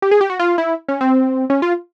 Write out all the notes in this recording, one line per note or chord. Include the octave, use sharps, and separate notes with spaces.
G4
G#4
G4
F#4
F4
E4
C#4
C4
C#4
F4